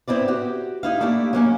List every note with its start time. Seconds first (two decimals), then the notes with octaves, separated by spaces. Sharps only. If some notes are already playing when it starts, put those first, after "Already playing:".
0.08 B3 C4 E4 F4 D5
0.28 F#4 G4
0.83 D#4 E4 F5
1.00 A3 A#3 D4 E4 G4
1.33 F#3 A#3 C#4 D#4